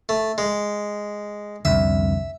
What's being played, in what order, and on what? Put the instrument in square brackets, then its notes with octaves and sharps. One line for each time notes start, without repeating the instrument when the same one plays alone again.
[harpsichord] A3
G#3
[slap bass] C2 F2 D3 [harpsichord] E5